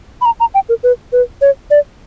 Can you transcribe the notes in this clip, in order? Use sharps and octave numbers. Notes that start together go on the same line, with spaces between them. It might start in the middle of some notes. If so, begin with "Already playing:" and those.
B5
A#5
A#5
G5
A#4
B4
B4
C#5
D5